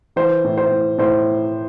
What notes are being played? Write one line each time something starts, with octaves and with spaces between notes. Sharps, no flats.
E3 C5
A2
C5
A2
A2 C5